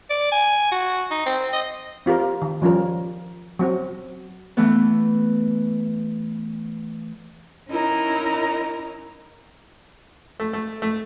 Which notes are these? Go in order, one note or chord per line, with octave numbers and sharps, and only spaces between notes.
D5
G#5
F#4
D#4
C4
D#5
C4 F4 G4 A#4
D#3
F3 G3 C#4 F4 A#4
F#3 C4 F#4
E3 A3 B3
C#4 D#4 E4 A#4 A#5
A3
A3
A3